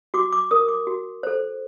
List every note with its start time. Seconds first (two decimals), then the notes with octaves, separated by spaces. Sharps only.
0.14 F#4 D6
0.33 D6
0.51 A#4 D#6
0.68 D6
0.87 F#4
1.23 A4 C5